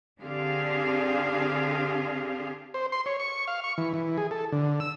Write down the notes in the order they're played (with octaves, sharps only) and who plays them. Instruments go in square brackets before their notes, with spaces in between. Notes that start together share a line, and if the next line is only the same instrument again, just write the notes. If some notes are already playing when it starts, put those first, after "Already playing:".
[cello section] D3 C4 D4 G4 G#4 F5
[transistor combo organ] C5
C6
C#5
C#6
F5
C#6
E3
E3
G#4
A4
D3
E6